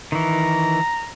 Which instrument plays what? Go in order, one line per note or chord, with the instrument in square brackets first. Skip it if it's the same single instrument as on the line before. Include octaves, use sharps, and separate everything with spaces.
[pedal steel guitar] D#3 E3 [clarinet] A#5